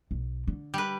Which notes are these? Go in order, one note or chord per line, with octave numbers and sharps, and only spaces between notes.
B1
D3
G3 B4